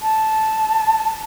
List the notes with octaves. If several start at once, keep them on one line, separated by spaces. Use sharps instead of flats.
A5